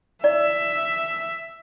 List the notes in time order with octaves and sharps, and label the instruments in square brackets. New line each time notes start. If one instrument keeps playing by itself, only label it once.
[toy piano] E4 D5 [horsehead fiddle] E5